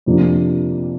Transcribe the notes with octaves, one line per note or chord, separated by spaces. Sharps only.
F2 C3 F3 A#3 D4